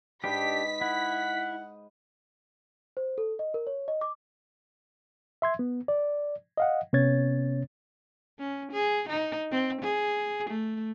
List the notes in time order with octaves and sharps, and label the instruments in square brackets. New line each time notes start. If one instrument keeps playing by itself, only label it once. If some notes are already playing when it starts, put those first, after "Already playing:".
[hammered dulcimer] G#2 B4 D#5 [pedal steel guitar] D4 G4 [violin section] B6
[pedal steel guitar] E4 [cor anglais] F#5
[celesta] C5
A4
D#5
A#4
C#5
D#5
D6
[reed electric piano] E5 C6 G#6
B3
D5
D#5 F5 F#5
C3 B3 C#4 C#5 G#6 A6
[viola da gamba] C#4
G#4
D#4
C4
G#4
A3